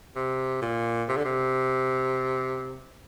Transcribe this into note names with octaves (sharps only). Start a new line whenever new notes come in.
C3
A#2
C3
D3
C3